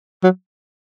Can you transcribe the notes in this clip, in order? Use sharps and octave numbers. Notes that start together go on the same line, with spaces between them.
F#3